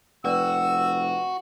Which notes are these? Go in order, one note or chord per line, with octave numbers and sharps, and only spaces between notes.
F1 F#4 B4 D5 G5 E6